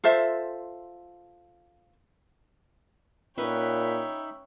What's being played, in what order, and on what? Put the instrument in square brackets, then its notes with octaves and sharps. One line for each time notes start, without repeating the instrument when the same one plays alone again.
[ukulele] F4 A4 C5 E5
[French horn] A#2 [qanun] C#4 B4 [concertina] D#4 E5 B5 [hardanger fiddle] C#5 G5